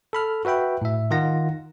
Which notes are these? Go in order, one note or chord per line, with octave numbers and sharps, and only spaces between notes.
A4 B5 F6
F#4 B4 E5 G5 B5
A2 E5
D#3 D#4 F4 F#5 A#6